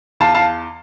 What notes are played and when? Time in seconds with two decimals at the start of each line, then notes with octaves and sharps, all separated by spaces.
0.20 E2 F5 A5
0.34 F5 A5